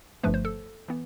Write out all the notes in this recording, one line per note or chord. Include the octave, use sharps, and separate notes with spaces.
G1 G2 F3 A3 B4
C5
A4
E3 B3